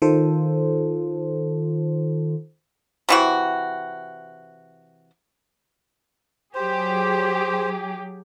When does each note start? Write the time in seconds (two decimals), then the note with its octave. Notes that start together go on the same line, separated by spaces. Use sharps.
0.02 D#3 F4 A4 C5
3.09 C3 E3 F#4
6.54 F#3 G4 G#4 C5